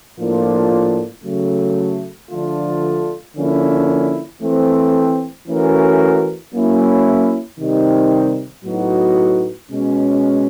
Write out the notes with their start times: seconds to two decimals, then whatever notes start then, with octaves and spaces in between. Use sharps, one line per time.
0.17 A2 F3 A#3 D4 F4
1.24 C#3 F#3 A3
2.30 D3 F3 A3 D4 F4
3.36 D3 F3 A#3 C#4 E4
4.41 E3 A3 C4
5.47 E3 A3 C#4 F#4 A#4
6.53 F#3 A#3 C#4 E4
7.59 C3 D#3 G3 C4 D#4
8.64 A2 F#3 B3 D#4 F#4
9.70 B2 G#3 C#4